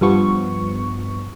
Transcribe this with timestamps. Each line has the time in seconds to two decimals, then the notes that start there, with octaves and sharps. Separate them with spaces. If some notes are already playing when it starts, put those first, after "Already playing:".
0.01 G2 F3 B3 C#6